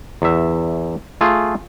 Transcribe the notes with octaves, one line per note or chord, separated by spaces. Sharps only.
E2 E5
A3 F4 G#4